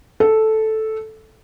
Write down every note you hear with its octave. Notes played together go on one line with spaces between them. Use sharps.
A4